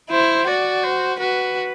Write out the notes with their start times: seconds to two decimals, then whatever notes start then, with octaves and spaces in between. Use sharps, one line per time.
0.11 E4 C5
0.47 F#4 D5
0.83 C5
1.19 F#4 B4